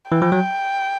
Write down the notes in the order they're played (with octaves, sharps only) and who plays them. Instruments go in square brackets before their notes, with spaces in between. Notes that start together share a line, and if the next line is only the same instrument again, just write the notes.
[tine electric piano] E3 [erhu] G5
[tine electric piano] F3
F#3